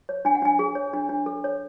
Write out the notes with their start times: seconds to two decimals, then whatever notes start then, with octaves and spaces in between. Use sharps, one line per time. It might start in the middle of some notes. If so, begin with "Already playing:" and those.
0.09 C#5
0.25 D4 G#5
0.35 F#5
0.42 D4 G#5
0.59 G#4
0.75 C#5
0.93 D4
1.09 D4
1.26 A4
1.44 C#5